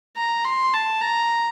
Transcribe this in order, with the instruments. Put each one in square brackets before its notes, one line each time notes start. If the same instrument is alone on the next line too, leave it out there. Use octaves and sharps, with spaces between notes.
[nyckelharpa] A#5
C6
A5
A#5